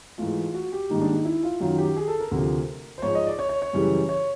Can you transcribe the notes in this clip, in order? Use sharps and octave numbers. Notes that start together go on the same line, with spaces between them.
G#2 E3 A3 F4
F#4
G4
G#2 D#3 G3 A#3 D#4
D4
D#4
E4
F4
F#2 D#3 F#3 F4
G4
G#4
A4
A#4
D2 C3 F3
C5
G#2 F3 G#3 C#5
D#5
D5
C#5
C#5
C#5
F#2 C#3 E3 G3
C#5